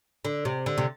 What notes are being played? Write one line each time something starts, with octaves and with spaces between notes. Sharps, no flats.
D3
C3
D3
C3